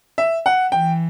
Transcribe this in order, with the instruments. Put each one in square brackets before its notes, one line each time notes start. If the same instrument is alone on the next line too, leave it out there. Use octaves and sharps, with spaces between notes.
[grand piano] E5
F#5
[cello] E3 [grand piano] G5